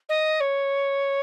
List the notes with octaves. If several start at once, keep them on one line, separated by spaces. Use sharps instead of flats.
D#5
C#5